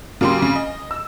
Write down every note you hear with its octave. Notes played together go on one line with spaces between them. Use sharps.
C#3 F#3 A#3 G4 C6
C#3
D#5
E6